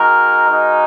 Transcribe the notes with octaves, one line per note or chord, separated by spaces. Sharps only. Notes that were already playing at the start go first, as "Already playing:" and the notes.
Already playing: G#3 D#4 F#4 A#4
G#3 D#4 F#4